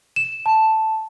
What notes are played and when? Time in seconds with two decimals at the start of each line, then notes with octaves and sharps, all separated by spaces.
0.16 E7
0.46 A5